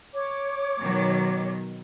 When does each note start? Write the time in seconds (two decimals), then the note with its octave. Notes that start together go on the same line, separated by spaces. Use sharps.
0.14 C#5 D6
0.82 B2 D#3 F#3